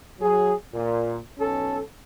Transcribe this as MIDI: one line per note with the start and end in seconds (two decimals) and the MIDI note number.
0.19 0.53 54
0.19 0.53 68
0.72 1.18 46
1.38 1.79 35
1.38 1.79 61
1.38 1.79 69